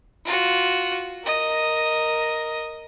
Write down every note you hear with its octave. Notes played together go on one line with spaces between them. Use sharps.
F4 F#4
A#4 D#5